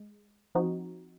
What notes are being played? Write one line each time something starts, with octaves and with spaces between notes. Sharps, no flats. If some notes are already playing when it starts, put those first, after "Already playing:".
Already playing: G#3
F3 C4 D#4 F#4